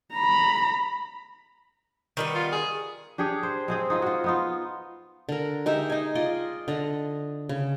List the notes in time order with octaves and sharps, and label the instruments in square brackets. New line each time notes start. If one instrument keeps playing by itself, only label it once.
[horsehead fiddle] A#5 B5
[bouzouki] D#3 G3 B3
[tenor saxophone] F4
G#4
[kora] D4 G4 G#4 C#5
C5
G#3 C4 G#4
D#4 F4 D#5
F4 F#4
B3 D#4 F4
[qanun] D3 A#4
G#3 D#4 G4 E5
D#4 G#5
F4 D5 D#5 C6
D3 D#5
C#3